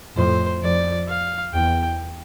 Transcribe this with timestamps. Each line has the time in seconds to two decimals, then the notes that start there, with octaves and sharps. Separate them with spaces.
0.16 F2 A2 C5
0.62 F2 D5
1.08 F5
1.53 E2 G5